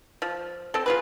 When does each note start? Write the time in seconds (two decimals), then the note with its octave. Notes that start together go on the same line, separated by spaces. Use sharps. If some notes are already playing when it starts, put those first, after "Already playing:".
0.22 F3
0.74 C4 A4
0.86 F4 G#4 B4